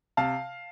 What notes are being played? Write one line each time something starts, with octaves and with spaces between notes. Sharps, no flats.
C3 F5 A5